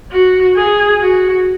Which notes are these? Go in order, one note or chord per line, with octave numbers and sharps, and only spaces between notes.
F#4
G#4
F#4